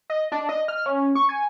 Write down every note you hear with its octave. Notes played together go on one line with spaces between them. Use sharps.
D#5
D4
D#5
F6
C#4
C#6
G#5